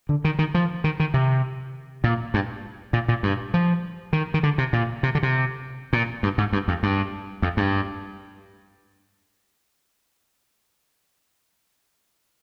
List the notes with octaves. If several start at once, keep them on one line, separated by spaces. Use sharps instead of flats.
D3
D#3
D#3
F3
D#3
D#3
C3
A#2
G2
A#2
A#2
G2
F3
D#3
D#3
D3
C3
A#2
C3
D3
C3
A#2
G2
G#2
G2
F2
G2
F2
G2